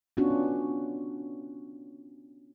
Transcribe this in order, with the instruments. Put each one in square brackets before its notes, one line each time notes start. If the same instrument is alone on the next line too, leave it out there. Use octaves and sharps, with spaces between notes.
[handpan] B3 C#4 D4 F4 F#4